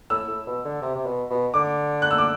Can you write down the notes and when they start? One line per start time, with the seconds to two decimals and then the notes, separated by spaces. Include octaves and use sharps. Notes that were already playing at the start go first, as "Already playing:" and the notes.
0.10 A2 E6
0.28 A2
0.47 B2
0.65 D3
0.82 C3
0.95 C3
1.06 B2
1.30 B2
1.54 D3 D6
2.02 F#6
2.11 E6
2.18 D6